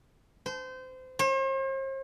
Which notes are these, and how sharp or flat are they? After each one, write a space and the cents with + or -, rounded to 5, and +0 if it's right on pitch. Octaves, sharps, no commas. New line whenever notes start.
C5 -25
C5 +45